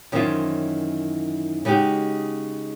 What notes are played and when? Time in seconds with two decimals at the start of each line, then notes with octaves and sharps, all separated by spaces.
0.12 F#2 D#3 E3 C4 C#4 F4
1.65 C#3 G#3 D#4 F#4 G4